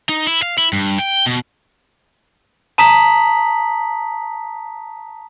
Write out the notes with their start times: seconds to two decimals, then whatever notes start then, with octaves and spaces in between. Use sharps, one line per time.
0.09 D#4
0.27 E4
0.43 F5
0.58 E4
0.73 G2
0.99 G5
1.26 B2
2.78 A5 A#5 D#6 B6 F#7